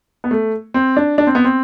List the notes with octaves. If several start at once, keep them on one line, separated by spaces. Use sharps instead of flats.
B3
A3
C4
D4
D4
C4
B3
C4